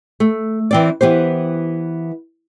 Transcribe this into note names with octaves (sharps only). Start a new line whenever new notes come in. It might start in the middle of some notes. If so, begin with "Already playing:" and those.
A3
E3 C4 D5
E3 B3 G4 C5